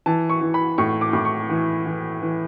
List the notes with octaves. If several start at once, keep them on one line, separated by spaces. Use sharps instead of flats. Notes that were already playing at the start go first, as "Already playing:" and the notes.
E3 A5
C#6
E3
B5
A2 C#6
D6
A2 D6
C#6
E3
E3
E3